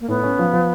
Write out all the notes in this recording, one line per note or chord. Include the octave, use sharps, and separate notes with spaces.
A#3
A2 B3
C#4
F3
F3